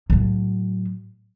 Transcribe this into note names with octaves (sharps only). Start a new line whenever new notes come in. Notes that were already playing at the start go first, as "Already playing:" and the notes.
A2 F#3